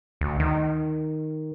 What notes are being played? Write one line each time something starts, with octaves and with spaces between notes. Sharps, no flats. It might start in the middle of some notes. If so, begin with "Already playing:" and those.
D2
D#3